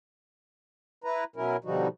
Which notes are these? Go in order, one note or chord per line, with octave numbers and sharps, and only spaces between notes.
E4 B4 A#5
B2 F#3 C#4 E4 A#4
B2 D3 F3 G3 D#4 F#4